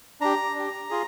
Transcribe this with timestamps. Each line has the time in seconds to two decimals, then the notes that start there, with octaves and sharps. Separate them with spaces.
0.21 D4 G4 A#5
0.55 D4 G4
0.90 F4 G#4